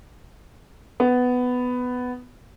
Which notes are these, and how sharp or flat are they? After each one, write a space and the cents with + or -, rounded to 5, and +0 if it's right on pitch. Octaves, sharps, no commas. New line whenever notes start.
B3 +10